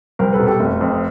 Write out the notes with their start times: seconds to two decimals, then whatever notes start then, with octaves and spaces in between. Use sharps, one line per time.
0.19 C2 A#4 C5
0.33 A4 B4
0.40 B2 A#4
0.47 G4 A4
0.60 F1
0.81 F2